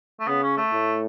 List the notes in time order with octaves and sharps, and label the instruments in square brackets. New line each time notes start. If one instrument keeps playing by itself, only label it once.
[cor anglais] A3
[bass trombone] C#3 [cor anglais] B3
[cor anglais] C#4
A3
[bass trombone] A2